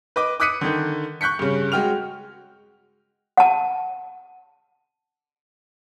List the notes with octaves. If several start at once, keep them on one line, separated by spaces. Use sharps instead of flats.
B4 D#5 D6
D6 D#6 F#6 B6 C#7 D#7
D3 D#3
C#6 F#6 G6 B6 C#7
G2 C#3
G#3 F#4 G5 F6 F7
F#5 A5